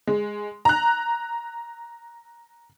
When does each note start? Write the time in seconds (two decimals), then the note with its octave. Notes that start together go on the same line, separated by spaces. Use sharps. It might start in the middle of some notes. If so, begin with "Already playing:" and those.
0.07 G#3
0.65 A#5 F#6